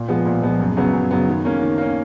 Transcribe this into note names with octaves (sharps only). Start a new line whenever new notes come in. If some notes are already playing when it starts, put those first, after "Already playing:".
Already playing: A#2
F3 G#3 B3
A#2
F3 G#3 B3
F#2
C#3 F#3 B3
F#2
C#3 F#3 B3
D#3
A#3 C#4
D#3
A#3 C#4